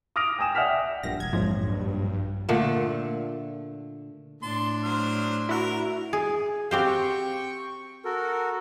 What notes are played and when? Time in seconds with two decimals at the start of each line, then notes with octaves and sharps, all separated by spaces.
0.16 D6 D#6 F6 A#6 D7 F7
0.39 G5 G#5 D#6 E7
0.55 D5 E5 F#5 G5 F6 B6
1.03 A#1 G2 A#2 A#6
1.20 E1 G#6
1.33 A#1 F2 G#2 F3 F#3
1.68 G2
2.49 A#2 D3 A3
4.43 A2 D4 A5 C6
4.83 F#3 C5 F6
5.49 E4 F#4 A#4
6.13 G#4
6.71 C4 F#4 G4 C5 F5 F6
6.86 G5 C#6
8.05 F#4 A4 A#4